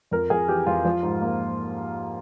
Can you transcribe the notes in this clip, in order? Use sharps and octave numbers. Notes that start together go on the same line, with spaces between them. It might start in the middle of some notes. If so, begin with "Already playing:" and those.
F2 A#4
F2 G#4
E3 G4
F2 F4
F3
G#2
A#3